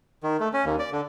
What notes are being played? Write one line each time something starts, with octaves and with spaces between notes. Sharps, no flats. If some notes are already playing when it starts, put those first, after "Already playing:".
D#3
A3
C#4
D#2
D5
D3